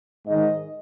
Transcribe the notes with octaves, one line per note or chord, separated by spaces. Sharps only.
G#2 D#3 D#5